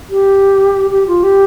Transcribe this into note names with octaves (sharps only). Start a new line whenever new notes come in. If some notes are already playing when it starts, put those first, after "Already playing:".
G4
G4
F4
G4